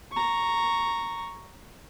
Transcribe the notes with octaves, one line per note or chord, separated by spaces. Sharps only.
A#5 C#6